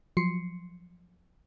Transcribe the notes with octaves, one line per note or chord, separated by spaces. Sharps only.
F3 F#3 C6 C7 C#7